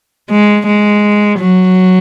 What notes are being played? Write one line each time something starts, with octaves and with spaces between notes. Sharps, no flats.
G#3
G#3
F#3